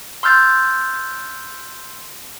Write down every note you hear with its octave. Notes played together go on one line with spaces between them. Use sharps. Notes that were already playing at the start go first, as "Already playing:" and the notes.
C6 E6 F6 G6 A6